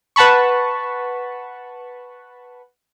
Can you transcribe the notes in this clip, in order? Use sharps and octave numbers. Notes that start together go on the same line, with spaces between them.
B4 F#5 A5 B5 C#6